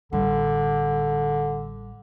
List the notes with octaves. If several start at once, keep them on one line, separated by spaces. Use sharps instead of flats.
A1 D3 G3